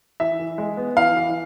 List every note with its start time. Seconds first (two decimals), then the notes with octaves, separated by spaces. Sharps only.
0.20 E3 E5
0.40 E3
0.58 G#3
0.77 B3
0.97 E3 F5
1.17 E3